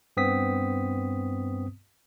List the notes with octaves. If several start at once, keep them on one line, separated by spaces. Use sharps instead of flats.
G2 B3 C4 D#6 B6